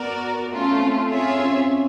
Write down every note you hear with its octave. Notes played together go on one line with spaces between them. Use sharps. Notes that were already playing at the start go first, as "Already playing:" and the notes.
Already playing: B3 F#4 A#4 D5
A3 C#4 F4
C4
F4 G#4 C#5 E5
C#4
C4